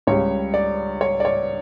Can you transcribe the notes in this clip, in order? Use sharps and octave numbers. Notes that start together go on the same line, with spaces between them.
C#2 C#3 G3 C#5
D5
C#5
D5
C#5